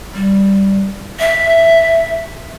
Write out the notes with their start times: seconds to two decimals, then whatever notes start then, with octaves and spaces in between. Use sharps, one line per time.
0.15 G3
1.20 E5